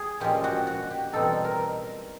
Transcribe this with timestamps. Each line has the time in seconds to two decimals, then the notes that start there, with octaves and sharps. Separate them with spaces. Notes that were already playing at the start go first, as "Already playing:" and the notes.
Already playing: G#4
0.20 A#2 F3 G#3 C#4 G4
0.44 F#4
0.67 F#4
0.91 G4
1.13 E2 B2 G3 C4 D#4 A4
1.45 A#4